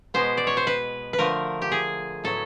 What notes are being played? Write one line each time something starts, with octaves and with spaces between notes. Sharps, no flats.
B2 G#3 B3 C5
D5
C#5
C5
B4
B4
D3 F3 A3 A#4
G4
G#4
A2 F#3 B3 A4